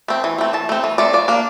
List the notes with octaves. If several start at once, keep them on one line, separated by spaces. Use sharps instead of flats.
A3 C4
E3
A3 C4
E3 A5
A3 C4
E3
A3 C4 D5
F3 D5
A#3 D4